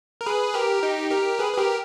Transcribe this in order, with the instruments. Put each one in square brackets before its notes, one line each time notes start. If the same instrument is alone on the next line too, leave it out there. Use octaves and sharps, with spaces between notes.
[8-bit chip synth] A#4
G#4 B4
G4 A#4
D#4 G4
G4 A#4
G#4 B4
B4
G4 A#4